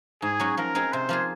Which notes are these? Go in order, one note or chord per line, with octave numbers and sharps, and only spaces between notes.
G#2 G#4
F#3 C#4 F#4
F3 A#4
C4 D#4 G#4
C3 C5
F3 A#3 F4 G#4